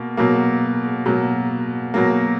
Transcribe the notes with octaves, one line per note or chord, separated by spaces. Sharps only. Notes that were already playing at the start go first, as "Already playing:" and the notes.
Already playing: B2 A#3
B2 F#3 A#3
B2 F#3 A#3
B2 F#3 A#3